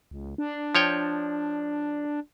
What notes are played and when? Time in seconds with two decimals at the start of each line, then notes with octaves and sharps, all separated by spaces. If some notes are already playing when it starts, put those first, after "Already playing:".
0.11 C#2
0.38 D4
0.75 F3 C#5 G5